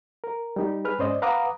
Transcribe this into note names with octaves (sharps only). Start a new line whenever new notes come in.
A#4
G3 D#4 G4
G#4 B4 F6
G#2 C#4 C5 D5 D#5
B4 F5 F#5 A#5 D6 D#6